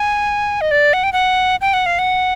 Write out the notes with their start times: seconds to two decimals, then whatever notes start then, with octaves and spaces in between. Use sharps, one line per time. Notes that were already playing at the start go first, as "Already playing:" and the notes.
Already playing: G#5
0.61 D#5
0.71 D5
0.93 F#5
1.03 G5
1.13 F#5
1.61 G5
1.73 F#5
1.86 F5
1.99 F#5